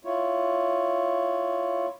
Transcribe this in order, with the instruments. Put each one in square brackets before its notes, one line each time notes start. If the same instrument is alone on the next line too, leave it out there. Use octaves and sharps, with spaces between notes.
[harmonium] E4 F4 C#5